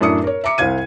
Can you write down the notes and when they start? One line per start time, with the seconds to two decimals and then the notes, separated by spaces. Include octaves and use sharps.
0.01 F#2 A2 D4 E5 D#6 C#7
0.24 A#4 C#5
0.44 E5 A#5 D6 C#7
0.58 C2 C5 F5 G#6 D#7